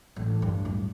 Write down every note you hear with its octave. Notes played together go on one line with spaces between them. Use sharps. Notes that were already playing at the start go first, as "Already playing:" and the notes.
A1
G2
D1